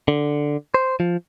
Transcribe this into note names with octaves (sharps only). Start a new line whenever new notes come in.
D3
C5
F3